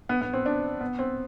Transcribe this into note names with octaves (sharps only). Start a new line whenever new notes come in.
B3
B3
C4
D4
B3
C4